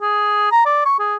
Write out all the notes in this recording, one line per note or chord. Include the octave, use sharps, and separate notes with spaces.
G#4
A#5
D5
C#6
G#4